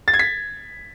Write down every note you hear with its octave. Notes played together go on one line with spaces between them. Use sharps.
A6
G#6
B6